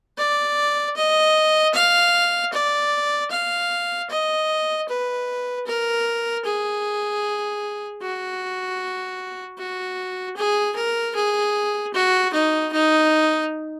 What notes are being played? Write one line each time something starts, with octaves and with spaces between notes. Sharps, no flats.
D5
D#5
F5
D5
F5
D#5
B4
A#4
G#4
F#4
F#4
G#4
A#4
G#4
F#4
D#4
D#4